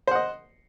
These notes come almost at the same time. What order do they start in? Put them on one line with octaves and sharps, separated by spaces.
C5 F#5 D#5